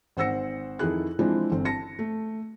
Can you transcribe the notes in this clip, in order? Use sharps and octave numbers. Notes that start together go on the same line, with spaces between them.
G#1 C5 F#5 E6 A#6 C#7
F2 D#3 D#4 E4 G#4 F#6
E3 F3 G#3 C4 D4 E4
G1 C4
A5 A#6 C#7
A3